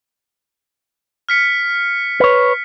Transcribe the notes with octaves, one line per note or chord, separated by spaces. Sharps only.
F6 B6 C#7
B4 C#5